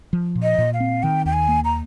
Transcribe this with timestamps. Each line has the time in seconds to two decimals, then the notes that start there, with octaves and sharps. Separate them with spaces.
0.13 F3
0.35 A#2
0.43 D#5
0.58 A#2
0.74 F5
0.80 C4
1.03 D#3 G5
1.25 D#2 G5
1.33 G#5
1.48 A#3
1.64 A#5